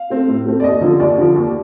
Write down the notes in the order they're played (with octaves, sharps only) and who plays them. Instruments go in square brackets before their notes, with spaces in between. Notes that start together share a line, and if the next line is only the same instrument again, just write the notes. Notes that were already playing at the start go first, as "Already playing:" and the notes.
Already playing: [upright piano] F5
A3 C4
A2
A3 C4
D5
D#2 D#5
D3 F3
D#2 D5
D3 F3
D#2